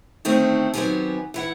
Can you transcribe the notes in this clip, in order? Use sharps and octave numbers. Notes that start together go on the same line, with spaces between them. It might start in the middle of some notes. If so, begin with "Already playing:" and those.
D3 D#3 A3 C4 C#4 D#4
D#3 F#3 B3 C4 G4 G#5
E3 E4 F#5